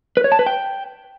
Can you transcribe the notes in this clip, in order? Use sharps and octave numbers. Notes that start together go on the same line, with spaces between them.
B4
C#5
A5
B4
G5